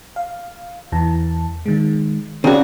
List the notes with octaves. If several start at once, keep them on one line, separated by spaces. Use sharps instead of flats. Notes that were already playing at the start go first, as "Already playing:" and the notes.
F5
E2 E3 A5
D#3 G#3
C#3 F#4 D5 G5 A5